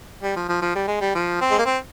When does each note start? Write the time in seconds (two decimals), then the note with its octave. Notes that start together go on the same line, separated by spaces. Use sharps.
0.23 G3
0.36 F3
0.49 F3
0.62 F3
0.75 G3
0.88 G#3
1.01 G3
1.15 F3
1.41 C4
1.51 G#3
1.58 A#3
1.66 C4